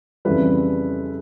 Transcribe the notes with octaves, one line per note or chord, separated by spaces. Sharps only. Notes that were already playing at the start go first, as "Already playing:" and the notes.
F2 C#3 E3 G3 B4